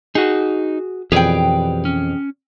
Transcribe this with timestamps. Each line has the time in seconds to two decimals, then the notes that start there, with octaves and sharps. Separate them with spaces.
0.15 D#4 F#4 G#4
1.12 F2 B2 E3 G4 G#4 B4 D5 G5
1.85 C#4